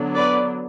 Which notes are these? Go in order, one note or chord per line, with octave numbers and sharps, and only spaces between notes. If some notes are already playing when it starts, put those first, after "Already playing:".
Already playing: D3 F#3 B3 D4
B4 D5